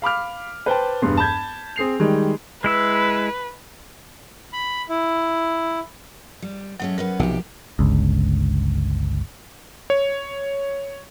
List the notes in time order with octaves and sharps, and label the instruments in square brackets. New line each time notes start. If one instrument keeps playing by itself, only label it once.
[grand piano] F5 B5 D6 F6
B4 C5 G5 A5
E1 G2 B3 C6
A5 B5 G6 G#6
C4 G#4 C7 F7
D#3 G3 G#3
[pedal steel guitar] G#3 E4 E6 [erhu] B4
[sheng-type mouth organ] B5
E4
[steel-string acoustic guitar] G3
[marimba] F#3 [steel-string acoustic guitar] G#3 A3 C#4
[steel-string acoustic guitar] B3 C#4 B4 [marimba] A#4
[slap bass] B1 C3 [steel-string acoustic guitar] F3 G4
[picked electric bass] G1 C#2
[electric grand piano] C#5